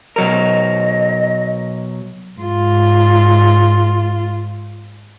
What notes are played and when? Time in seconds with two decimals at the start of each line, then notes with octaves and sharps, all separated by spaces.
0.16 B2 F#3 A#4 D#5
2.39 G#2 F4